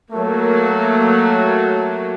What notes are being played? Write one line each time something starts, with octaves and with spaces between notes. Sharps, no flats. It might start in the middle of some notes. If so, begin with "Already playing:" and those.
F#3 A3 A#3